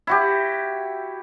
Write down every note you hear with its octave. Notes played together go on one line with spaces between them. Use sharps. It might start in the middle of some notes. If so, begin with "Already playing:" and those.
E4 F#4 G4